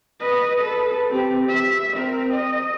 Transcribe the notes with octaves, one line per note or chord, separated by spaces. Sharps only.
B4 D#5
A4 B4
C4 G4
E5
C4 A#4
D#5